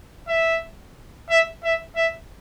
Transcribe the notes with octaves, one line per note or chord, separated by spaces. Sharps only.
E5
E5
E5
E5